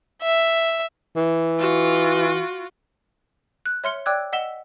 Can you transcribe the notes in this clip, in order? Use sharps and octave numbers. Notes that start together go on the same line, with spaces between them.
E5
E3
F4 F#4
F#6
C#5 E5 C6 F6 C#7 G7
D5 G5 D6 E6 F#6 G#6
D#5 F#5 E6 B6 E7 G7